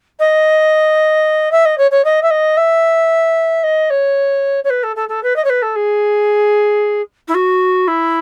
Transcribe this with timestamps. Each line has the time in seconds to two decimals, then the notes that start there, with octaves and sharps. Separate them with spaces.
0.20 D#5
1.52 E5
1.65 D#5
1.78 C#5
1.91 C#5
2.05 D#5
2.23 E5
2.31 D#5
2.57 E5
3.63 D#5
3.90 C#5
4.64 C#5
4.70 B4
4.83 A4
4.96 A4
5.09 A4
5.23 B4
5.36 D#5
5.45 C#5
5.50 B4
5.62 A4
5.76 G#4
7.28 E4
7.35 F#4
7.88 E4